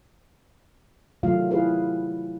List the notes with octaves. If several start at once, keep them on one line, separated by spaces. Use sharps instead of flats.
C3 D#3 F#3 A3 F4 F5
E4 G#4 B4 F5